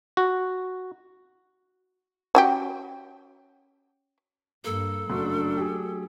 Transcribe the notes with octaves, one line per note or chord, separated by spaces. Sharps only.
F#4
C#4 F#4 G4
G2 A#3 A4
F#1 F#3 A3 D4 F#4 C6
G4 G#4